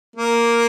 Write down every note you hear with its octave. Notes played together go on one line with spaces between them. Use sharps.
A#3